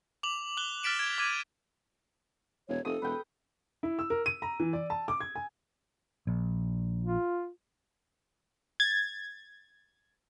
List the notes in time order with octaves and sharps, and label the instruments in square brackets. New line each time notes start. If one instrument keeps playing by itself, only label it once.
[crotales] D6 F7 F#7
D6 F#6 F#7 G7
F6 A6 B6 D7 E7
G#6 D7
D6 G#6 D#7
[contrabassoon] E1 [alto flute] C#5
[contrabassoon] F1 [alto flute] A4 [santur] D#6
[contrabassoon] E1 [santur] B4 G5
[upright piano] E4
E6
A#4
D#7
A#5
E3
D5
A5
D6
G#6
G#5
[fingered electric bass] A#1
[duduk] F4
[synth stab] G#6 A6